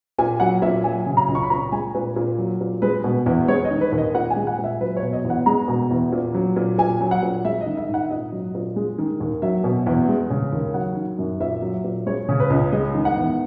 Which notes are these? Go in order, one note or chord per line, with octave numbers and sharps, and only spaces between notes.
A#2 G#5
F#3 F#5
A#2 E5
F#3 G#5
C#3
A#5
C#2
C#6
B5
A#2 A#5
G#3 G#5
A#2 B4
A#2
F#3
A#2
G#3 B4
B2
E2
G#3 C#5
D#5
D#3
B4
D#2
D#5
A#2 F#5
G#5
G#3
F#5
A#2
E5
F#3 B4
C#5
B2
D#5
E2
F#5
G#3 A#5
B2
E2
A#2
F#3
A#2
A#2 G#5
F#3
F#5
A#2
G#3 E5
D#5
D#3
E5
G#2
F#5
A#2 D#5
F#3
A#2
G#3
D#3
D#2
F#3 E5
B2
E2
G#3
C#3
D#2
F#3 F#5
D#3
F#2
A#2 E5
F#3
A#2
G#3 C#5
C#3
B4
C#2
G#3 D#5
D#3
F#5
E2